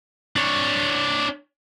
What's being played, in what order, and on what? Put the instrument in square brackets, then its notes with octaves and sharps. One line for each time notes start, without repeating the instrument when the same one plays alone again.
[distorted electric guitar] D4 C#5